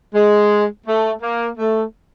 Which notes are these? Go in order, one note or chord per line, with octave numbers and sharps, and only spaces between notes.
G#3
A3
A#3
A3